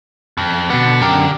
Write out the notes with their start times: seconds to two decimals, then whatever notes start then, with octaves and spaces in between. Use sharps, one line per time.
0.37 F2
0.70 B2 D3 B3
1.01 F#2 G4 A#4